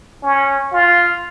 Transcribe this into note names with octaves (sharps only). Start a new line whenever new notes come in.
C#4
F4